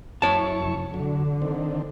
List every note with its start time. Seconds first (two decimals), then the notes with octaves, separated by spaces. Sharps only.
0.22 F#2 E4 C#5 A5 C#6
0.59 F1
0.94 D3 F#3
1.42 D#3 C4 D4